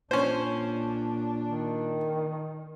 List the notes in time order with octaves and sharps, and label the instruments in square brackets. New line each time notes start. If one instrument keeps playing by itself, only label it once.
[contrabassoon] A#2 [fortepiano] C#4 C5 [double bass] D4
[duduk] D#3